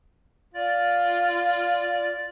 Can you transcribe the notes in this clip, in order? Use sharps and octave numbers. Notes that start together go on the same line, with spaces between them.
F4 D5